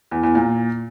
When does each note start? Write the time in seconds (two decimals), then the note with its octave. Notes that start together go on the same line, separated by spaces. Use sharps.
0.11 E2
0.23 E2
0.35 A#2